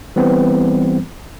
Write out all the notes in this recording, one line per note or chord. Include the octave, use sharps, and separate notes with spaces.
E3 G3 B3 C4